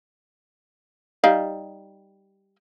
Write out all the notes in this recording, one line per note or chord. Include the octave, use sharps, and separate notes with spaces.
G3 D#4 F5